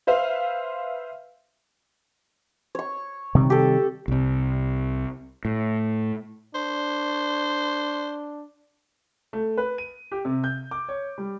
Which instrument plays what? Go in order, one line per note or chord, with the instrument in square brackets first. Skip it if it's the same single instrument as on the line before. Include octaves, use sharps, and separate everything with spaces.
[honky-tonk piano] B4 C5 E5 F5
[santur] C#5 C#6
[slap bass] C3 D#3 G3
[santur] G4 A4
[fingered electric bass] C2 C3
A2
[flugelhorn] D4 [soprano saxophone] C5
[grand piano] A3
B4
D#7
G4
C3
G6
D6
C#5
G3